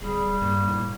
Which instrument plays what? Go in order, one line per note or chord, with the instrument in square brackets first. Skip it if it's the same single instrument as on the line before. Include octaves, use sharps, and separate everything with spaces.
[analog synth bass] D1 [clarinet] G3 [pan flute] G#4
[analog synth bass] G2 [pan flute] A#3
[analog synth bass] A2